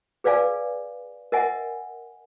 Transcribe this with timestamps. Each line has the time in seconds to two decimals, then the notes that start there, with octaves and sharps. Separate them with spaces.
0.24 G#4 B4 D5 F5 G#5
1.32 A#4 D#5 E5 F#5 G#5